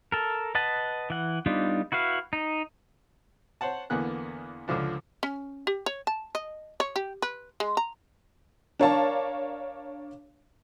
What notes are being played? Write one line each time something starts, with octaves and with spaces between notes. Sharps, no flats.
A4 A#4
B4 D#5 F#5 A5
E3 F#5
G3 B3 D4 D#4 F4
E4 F#4 B4 F5
D#4
C5 C#5 F#5 A5
E2 D3 A#3 B3 G#5 F#6
C#2 D3 F3 D4
C#4
G4
C#5
A5
D#5
C#5
G4
B4
G#3
A#5
D4 A#4 C#5 D5 F5 A5